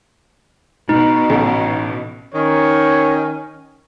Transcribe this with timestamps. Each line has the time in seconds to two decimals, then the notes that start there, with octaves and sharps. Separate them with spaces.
0.89 B2 D#4
1.30 A1 A4
2.34 D#3 C#4 C#5